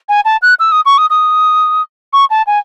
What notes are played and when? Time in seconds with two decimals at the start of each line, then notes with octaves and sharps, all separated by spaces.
0.09 G#5
0.25 A5
0.42 F#6
0.60 E6
0.72 D#6
0.86 C#6
0.98 D#6
1.10 D#6
2.13 C#6
2.30 A5
2.47 G#5